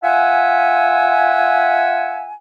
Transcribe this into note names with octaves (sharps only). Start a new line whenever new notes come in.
F4 E5 F#5 G#5